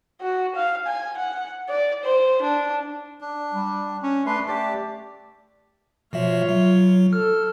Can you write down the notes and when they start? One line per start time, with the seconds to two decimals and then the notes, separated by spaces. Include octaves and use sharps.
0.21 F#4
0.55 F5
0.86 G#5
1.17 F#5
1.69 D5
2.04 C5
2.42 D4
3.21 D4
3.53 G3
4.03 C#4
4.26 A3 D4 B4 C6
4.48 G4 D5 A5
6.13 B2 F3 F4 C#5 E5
6.49 F#3
7.13 A4 F6